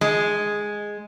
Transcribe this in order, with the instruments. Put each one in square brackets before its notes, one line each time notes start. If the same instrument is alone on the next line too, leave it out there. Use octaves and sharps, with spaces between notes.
[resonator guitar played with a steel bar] G#3